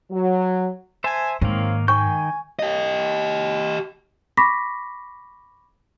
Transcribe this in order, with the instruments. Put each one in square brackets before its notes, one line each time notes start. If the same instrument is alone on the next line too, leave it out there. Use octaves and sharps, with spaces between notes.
[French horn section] F#3
[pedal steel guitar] C5 E5 A5 [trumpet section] G#5
[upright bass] G#2 [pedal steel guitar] D#3 A#3 [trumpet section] C4 C#5 F5
[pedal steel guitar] D#3 G5 G6 [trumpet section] G#5 [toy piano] C#6
[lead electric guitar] G4 D#5
[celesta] B5 C#6 D6 A#6 B6